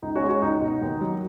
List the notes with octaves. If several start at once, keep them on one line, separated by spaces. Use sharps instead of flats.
C#2 D#4
C#4 F#4
G#3
C#4 F#4
C#2 D#4
B2
D#2
F#3